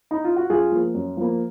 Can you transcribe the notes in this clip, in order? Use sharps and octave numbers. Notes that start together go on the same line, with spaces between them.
D#4
F4
F#4
F#2 F4 G#4
F3 A#3
F#2
F3 A#3